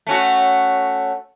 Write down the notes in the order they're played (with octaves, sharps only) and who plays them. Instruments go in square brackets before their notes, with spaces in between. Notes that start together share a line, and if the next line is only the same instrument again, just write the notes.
[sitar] A3 C#4 F#4